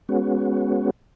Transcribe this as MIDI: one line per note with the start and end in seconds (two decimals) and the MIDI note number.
0.09 0.90 56
0.09 0.90 59
0.09 0.90 61
0.09 0.90 66